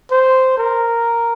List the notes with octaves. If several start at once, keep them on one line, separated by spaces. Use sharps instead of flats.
C5
A#4